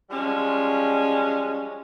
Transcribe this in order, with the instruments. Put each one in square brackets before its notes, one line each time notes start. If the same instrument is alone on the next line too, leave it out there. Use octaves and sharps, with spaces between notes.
[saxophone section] F3 G3 G#3 C#4